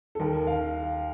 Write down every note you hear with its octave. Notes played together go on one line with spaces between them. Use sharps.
A4
D#2 A#4
F5